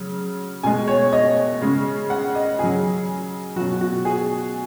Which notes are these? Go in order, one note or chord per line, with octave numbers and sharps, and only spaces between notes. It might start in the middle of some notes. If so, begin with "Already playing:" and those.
Already playing: C#3 F#3
B2 G#3 G#5
C#5
D#5
C#3 G#3
F#5
D#5
C#3 F#3 G#4
B2 F#3 F#4
F#4
G#4